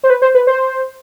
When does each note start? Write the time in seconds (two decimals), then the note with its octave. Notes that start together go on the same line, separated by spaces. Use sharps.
0.03 C5
0.10 B4
0.22 C5
0.35 B4
0.47 C5